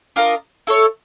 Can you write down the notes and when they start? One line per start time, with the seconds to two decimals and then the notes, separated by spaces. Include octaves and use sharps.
0.16 D4 F4 A#4 D#5
0.67 E4 A4 C#5